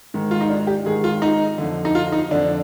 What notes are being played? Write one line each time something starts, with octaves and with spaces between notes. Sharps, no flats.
G#2 D#3
F4
D#4
D4
G4
G#2 D#3 G#4
F4
D#4
F2 D3
D#4
F4
D#4
F2 D3 D4